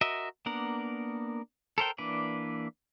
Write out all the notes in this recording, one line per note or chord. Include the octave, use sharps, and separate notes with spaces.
F#4 A#4 D#5 E5
A#3 B3 D4 A#4 F#5
A4 A#4 C5 G5
E3 A#3 D4 B4 D5